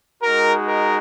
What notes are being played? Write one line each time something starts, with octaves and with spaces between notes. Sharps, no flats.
G#3 D#4 F#4 A#4
A#4